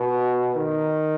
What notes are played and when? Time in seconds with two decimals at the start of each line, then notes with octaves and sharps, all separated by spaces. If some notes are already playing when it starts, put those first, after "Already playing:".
Already playing: B2
0.56 D#3